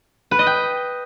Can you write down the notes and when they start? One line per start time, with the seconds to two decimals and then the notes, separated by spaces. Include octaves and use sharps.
0.31 B4
0.39 D#5
0.46 G5